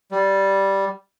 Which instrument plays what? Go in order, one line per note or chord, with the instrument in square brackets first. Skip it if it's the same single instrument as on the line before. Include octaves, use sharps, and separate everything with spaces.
[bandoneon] G3